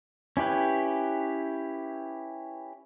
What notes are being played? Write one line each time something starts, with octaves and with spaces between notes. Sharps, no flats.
C#4 E4 G4 B4